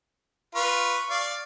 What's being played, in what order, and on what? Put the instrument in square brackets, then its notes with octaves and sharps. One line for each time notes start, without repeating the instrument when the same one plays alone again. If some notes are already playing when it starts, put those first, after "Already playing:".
[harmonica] F4 B4 [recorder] C#6
[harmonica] D5 F5